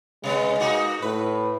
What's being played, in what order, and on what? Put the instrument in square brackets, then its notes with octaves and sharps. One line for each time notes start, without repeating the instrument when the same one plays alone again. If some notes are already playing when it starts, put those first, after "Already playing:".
[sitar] C3 B3 [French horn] G#3
[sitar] A#3 D#4 F#4
[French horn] A2 [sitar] B4